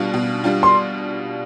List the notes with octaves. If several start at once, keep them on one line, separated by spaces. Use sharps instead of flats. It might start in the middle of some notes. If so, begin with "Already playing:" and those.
Already playing: B2 G3 D4 F4
B2
G3 D4 F4
C6